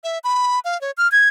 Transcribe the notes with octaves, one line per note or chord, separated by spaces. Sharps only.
E5
B5
F5
C#5
F6
G#6